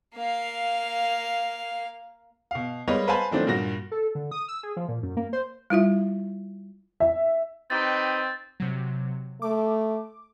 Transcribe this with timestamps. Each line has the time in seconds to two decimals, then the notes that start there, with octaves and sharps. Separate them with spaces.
0.15 A#3 F5
2.51 B2 F5
2.88 G3 G#3 A#3 B4 C#5 D#5
3.08 B4 C5 F5 G#5 A5 B5
3.31 D#3 F3 F#3 A3 C4 D4
3.47 G2 A#2 F#4 A#6
3.91 A4
4.15 D3
4.31 D#6
4.48 E6
4.63 G#4
4.77 F3
4.88 A#2
5.03 F#2
5.17 A#3
5.33 C5
5.70 G3 E4 F4 E5
7.00 E5
7.70 C4 D#4 G4 B4 A6
8.60 C3 F#3
9.42 A3 D6